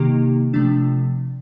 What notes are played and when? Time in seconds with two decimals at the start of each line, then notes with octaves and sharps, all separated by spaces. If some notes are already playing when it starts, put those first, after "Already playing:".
Already playing: C3 D#3 A#3 D#4 G4
0.53 C3 F3 A3 D4